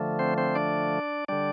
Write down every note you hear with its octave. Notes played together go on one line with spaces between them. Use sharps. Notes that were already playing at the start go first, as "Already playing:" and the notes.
Already playing: D3 F3 A3
C4 C5
C4 C5
D4 D5
D3 G3 D4 D5